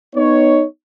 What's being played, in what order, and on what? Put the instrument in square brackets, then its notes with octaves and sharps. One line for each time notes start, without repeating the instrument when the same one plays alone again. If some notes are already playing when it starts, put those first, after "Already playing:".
[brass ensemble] B3 D#4 C#5